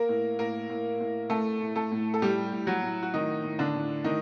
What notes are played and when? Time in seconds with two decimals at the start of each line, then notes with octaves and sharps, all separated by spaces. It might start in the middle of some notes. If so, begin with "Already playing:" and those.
Already playing: A#3 A#4
0.09 A2
0.39 A2 A#3 A#4
0.70 A2
1.00 A2
1.30 A2 A3 A4
1.61 A2
1.76 A3 A4
1.92 A2
2.14 A4
2.22 A2 G3 G4
2.52 A2
2.67 F#3 F#4
2.82 A2
3.03 F#4
3.14 A2 D#3 D#4
3.44 A2
3.59 D3 D4
3.74 A2
4.04 A2 D#3 D#4